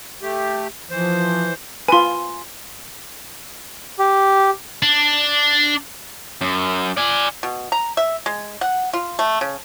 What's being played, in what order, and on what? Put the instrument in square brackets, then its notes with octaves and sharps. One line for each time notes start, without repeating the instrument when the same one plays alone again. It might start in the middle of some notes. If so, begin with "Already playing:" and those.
[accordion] A3 G4
[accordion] E3 C5 [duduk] F3
[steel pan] F4 B4 [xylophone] G#5 C6
[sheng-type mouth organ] G4
[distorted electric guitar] D4
F#2
D5 G#5
[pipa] B2
A#5
E5
G#3
F#5
F4
A3
C#3